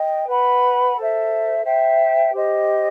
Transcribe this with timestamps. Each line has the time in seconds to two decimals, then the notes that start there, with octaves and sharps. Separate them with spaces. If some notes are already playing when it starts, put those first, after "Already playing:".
Already playing: D#5 G5
0.27 B4 F#5 B5
0.97 A4 C5 E5
1.64 C5 E5 G5
2.32 G4 C5 D#5